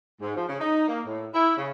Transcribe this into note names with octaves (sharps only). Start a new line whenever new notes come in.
G#2
F3
C#3
D#4
A#3
A2
E4
C#3